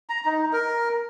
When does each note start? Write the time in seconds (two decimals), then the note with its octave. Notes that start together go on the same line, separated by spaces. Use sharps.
0.09 A#5
0.25 D#4
0.53 A#4